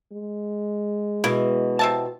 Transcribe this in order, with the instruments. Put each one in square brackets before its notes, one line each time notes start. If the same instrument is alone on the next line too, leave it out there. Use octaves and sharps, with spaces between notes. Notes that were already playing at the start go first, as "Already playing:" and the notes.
[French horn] G#3
[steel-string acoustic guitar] B2 E3 [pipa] E4
[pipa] C3 E5 A5